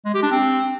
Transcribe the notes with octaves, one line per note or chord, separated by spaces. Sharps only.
G#3
G4
D4
C4